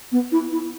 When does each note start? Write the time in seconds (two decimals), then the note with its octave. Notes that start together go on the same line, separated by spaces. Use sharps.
0.12 B3
0.32 E4
0.52 E4